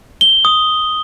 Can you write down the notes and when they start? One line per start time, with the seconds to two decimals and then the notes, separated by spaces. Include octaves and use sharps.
0.21 G7
0.45 D#6